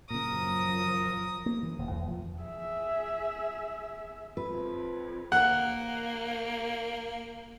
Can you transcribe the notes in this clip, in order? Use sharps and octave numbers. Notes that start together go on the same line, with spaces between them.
F#2 A#2 C#3 F3 A#4 D#6
A#3
E3
D#1
E2
F3
G#4 E5
F2 B4
A#3 F#5